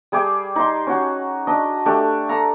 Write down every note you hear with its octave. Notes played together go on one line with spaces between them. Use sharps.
G3 G#4 G5 D6
D#4 C6
C#4 F#4
D4 D#5
A3 D4 G4
A4 A#5